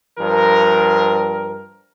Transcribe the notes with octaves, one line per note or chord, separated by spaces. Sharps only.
G2 F3 A#4